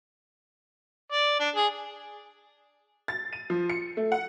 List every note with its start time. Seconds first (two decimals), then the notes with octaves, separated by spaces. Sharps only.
1.12 D5
1.40 D4
1.55 G#4
3.08 A6
3.33 D#7
3.50 F3
3.70 C#7
3.97 A3
4.12 F#5